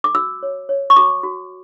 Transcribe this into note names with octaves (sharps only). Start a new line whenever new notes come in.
D6
F#4 E6
C#5
C#5
C#6
F#4 D6
F#4